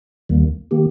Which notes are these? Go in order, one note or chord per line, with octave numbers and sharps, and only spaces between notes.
D#2 D#3 G3 A#3
D#3 A#3 G4